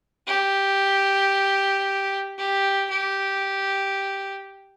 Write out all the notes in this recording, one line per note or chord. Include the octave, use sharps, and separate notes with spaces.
G4
G4
G4